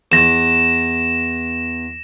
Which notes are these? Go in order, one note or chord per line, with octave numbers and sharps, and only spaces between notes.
E2 A#6 E7